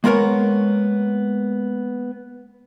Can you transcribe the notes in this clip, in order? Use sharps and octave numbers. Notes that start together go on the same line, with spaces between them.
G#3 A#3 B3 A#4 C#5